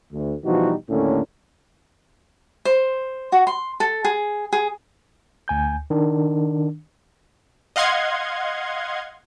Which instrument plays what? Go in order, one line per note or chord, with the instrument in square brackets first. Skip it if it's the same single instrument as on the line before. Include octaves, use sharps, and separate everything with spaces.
[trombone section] D2
B2 E3 F3 G3 D#4 F#4
D#2 A2 D3 A#3 C#4
[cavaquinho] C5
F#4
C6
A4
G#4
G#4
[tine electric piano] D2 G#5 G6
D#3 D4
[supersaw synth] D#5 F5 F#5 C6 G#6